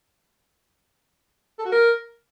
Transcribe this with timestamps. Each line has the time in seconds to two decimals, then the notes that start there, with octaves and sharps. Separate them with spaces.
1.59 A4
1.65 F#4
1.72 A#4